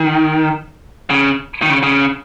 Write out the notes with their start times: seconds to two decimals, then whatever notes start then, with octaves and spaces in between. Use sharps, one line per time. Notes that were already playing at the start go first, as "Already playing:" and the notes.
Already playing: D#3
1.10 C#3
1.62 D#3
1.70 C#3
1.83 C#3